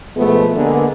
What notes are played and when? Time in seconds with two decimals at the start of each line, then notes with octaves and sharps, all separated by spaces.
0.17 B2 F3 G#3 A3 B3
0.56 D3 G#3 A#3 B3